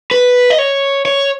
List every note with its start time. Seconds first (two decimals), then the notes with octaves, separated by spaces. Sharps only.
0.11 B4
0.50 D#5
0.58 C#5
1.05 C#5